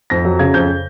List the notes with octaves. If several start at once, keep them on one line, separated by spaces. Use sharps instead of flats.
F2 A#6
F#3
C#3 G#6
F2 G6